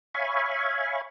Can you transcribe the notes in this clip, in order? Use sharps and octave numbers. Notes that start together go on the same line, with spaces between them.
C#5 E5 F5 G#5 B5 C#6